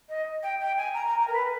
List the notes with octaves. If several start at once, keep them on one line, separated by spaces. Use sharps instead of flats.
D#5
G5
G5
G#5
A#5
A#5
A#5
A#4
B4